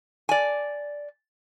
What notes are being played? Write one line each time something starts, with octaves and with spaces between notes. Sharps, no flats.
D5 G#5